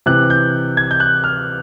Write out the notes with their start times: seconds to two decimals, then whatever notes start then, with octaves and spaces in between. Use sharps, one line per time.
0.06 C3 E3 F#6
0.30 G6
0.77 G#6
0.91 G6
1.00 F#6
1.24 F6